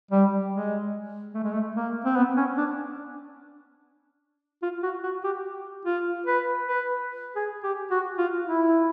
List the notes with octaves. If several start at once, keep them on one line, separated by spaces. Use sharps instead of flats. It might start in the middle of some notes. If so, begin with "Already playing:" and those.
G3
G#3
A3
G#3
A3
A#3
C4
B3
C#4
D4
F4
F#4
F#4
G4
F4
B4
B4
G#4
G4
F#4
F4
E4